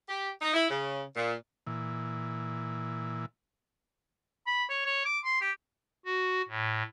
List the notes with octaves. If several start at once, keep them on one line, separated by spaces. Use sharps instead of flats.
G4
D#4
E4
C#3
A#2
A#2 E3
B5
C#5
C#5
D6
C6
G4
F#4
A2